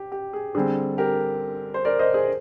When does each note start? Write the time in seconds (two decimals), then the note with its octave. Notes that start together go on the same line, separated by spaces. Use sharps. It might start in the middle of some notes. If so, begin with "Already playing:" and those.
Already playing: G4
0.12 G4
0.33 G#4
0.55 D3 G3 C4 G#4
0.98 G4 A#4
1.74 C5
1.85 A#4 D5
1.99 C5 D#5
2.14 G#4 C5